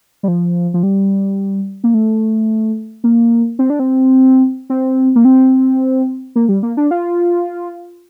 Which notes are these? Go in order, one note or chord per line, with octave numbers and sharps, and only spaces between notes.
G3
F3
F3
G3
A#3
A3
A#3
C4
D4
C4
C4
A#3
C4
A#3
G3
A#3
D4
F4